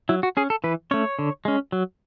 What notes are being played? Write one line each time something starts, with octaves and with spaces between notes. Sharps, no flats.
F#3 E4
F#4
C#4 G#4
A4
E3 B4
A3 C#4 C#5
D3
G#3 C#4
F#3